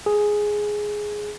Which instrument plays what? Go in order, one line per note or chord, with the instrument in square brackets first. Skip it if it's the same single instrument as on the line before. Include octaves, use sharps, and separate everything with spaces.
[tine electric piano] G#4